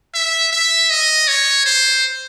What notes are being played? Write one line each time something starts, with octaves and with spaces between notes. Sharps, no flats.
E5
E5
D#5
C#5
C5